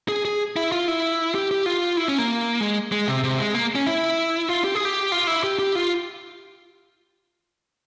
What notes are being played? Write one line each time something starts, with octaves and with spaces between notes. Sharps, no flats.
G#4
G#4
E4
F4
E4
G4
G4
F4
E4
C#4
A#3
G#3
G#3
C3
C3
G#3
A#3
C#4
E4
F4
G4
G#4
G4
F4
E4
G4
G4
F4